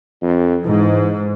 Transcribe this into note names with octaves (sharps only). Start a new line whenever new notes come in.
F2
G#2 E3